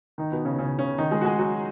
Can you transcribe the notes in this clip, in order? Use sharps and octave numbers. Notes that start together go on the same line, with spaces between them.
D#3 D#4
B2 B3
C#3 C#4
C#3 C#4
C#3 C#4
D#3 D#4
G#3 G#4
F#4
G#3 G#4
F#3 F#4